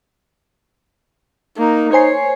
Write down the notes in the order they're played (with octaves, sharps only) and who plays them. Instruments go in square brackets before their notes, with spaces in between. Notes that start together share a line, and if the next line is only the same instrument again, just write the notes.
[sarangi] A#3 [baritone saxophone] D#4
[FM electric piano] C5 G#5 C7 [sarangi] C#5